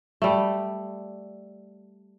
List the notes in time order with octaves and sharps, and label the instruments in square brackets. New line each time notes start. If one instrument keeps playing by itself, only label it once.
[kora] G3 A3